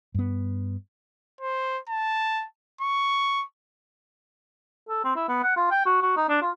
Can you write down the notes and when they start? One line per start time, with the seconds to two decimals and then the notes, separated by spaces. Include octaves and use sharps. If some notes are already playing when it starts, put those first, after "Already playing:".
0.14 G2 B3
1.41 C5
1.89 A5
2.81 C#6
4.89 A4
5.04 C4
5.16 E4
5.28 B3
5.43 F#5
5.56 F4
5.71 G5
5.86 F#4
6.02 F#4
6.16 D#4
6.29 D4
6.42 F4